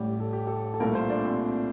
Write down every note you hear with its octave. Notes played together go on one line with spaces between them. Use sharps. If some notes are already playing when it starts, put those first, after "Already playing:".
Already playing: A1 A2 G3 G4
A4
G4
A4
A4
C2 A#2 A3 A#4
C5
D4
C4